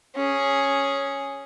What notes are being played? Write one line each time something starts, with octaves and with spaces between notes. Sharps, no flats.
C#4 G#4